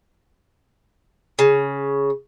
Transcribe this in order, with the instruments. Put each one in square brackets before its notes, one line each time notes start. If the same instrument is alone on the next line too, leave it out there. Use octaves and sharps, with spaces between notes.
[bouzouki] C#3